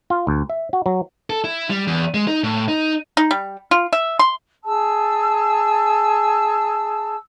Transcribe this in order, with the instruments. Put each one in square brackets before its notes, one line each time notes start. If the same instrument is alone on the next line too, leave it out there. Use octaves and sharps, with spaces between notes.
[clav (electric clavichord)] F4
D2
E5
F#4
F#3
[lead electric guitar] A4
E4
G3
E2
G#3
D#4
A2
D#4
[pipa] D#4
G3
F4
E5
C6
[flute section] G#4 A5 E6